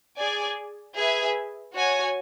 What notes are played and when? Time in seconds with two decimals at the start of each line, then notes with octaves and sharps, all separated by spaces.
0.17 G#4 D5 G#5
0.97 G#4 B4 E5 G#5
1.76 F#4 C#5 G#5